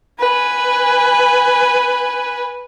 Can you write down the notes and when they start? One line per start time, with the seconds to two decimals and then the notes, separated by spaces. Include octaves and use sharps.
0.19 B4 G#5